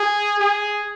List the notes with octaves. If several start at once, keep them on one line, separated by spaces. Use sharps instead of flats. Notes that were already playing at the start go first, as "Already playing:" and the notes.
Already playing: G#4
G#4